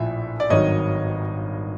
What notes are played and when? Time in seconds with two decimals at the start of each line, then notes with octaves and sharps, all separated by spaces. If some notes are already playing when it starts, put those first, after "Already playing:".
Already playing: A#1 A2 F3 E5
0.40 D5
0.50 G#1 G2 D#3 F#3 C#5 D#5